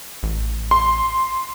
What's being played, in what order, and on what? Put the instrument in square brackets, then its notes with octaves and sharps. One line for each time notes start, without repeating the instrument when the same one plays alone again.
[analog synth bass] A1
[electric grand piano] C6